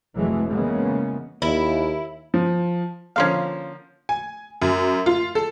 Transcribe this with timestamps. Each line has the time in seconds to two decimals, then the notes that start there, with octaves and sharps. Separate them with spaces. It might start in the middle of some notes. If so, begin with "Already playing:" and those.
0.16 F1 E3 F#3 G#3 A3
0.50 C#3 E3 G#3 A#3 B3 C#4
1.42 D#2 E4
2.34 F3
3.16 D3 F3 A#3 C#4 F4 F5
4.09 G#5
4.62 F#2
5.06 F4
5.35 A4